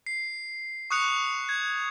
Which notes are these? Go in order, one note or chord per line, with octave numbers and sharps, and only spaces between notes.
C7
C#6 D#6 F#6 C#7 F7
G#6